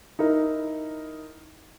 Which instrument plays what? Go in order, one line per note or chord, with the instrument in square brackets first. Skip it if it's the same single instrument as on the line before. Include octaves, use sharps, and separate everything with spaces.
[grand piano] D#4 E4 A#4